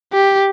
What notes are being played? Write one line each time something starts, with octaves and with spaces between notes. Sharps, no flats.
G4